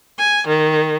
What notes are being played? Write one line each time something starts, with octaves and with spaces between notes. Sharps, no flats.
G#5
D#3